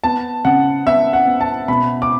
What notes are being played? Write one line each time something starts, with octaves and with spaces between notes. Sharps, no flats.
B3 A5
C#3 F#5
B3 E5
F#5
B3
A5
B2 B5
D6